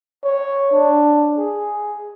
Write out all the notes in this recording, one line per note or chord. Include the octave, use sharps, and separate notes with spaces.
C#5
D4
G#4